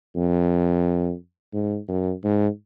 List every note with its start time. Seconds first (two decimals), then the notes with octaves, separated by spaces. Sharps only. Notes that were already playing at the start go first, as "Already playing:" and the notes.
0.16 F2
1.54 G#2
1.88 F#2
2.24 G#2